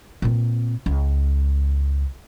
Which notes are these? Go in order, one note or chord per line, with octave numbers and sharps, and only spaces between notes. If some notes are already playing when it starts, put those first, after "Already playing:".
A#2 C4
C#2